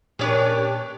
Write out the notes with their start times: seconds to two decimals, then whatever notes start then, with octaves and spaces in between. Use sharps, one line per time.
0.19 A#2 C#4 D4 G4 B4 C#5